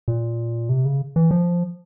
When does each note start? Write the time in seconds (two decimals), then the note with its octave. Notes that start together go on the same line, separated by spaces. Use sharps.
0.08 A#2
0.69 C3
0.85 C#3
1.16 E3
1.31 F3